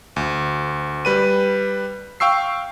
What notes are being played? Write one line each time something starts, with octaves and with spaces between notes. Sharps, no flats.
D2
G3 B4 D#7
F5 G5 C#6 E6 C7